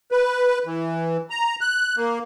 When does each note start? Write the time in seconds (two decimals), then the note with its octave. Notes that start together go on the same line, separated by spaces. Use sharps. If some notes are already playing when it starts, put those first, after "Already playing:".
0.12 B4
0.66 E3
1.30 A#5
1.61 F#6
1.97 A#3